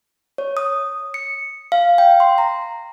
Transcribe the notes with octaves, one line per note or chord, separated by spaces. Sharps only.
C#5
D#6
C#7
F5
G5
C6
A#5